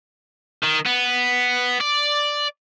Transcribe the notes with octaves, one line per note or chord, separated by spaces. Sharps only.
D#3
B3
D5